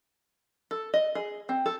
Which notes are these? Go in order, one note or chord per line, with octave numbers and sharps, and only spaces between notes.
A4
D#5
G#4
C4
A4